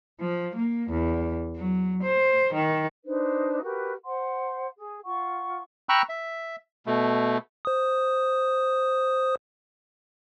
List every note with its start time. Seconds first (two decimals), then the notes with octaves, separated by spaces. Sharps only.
0.20 F3
0.55 A#3
0.90 E2
1.57 F#3
2.03 C5
2.54 D#3
3.04 D4 D#4 B4 C5
3.62 F#4 G4 A#4 B4
4.05 C5 F#5 C6
4.77 G#4
5.04 F4 F#5 C#6
5.89 G5 A#5 B5 C#6 E6 F#6
6.09 E5
6.86 B2 A3
7.65 C5 D#6